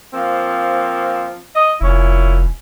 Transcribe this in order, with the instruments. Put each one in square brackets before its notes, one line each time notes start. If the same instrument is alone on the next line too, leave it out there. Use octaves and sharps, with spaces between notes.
[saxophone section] F3 A#3 C4
D#5
[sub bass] F1 [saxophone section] A#2 C#4 E4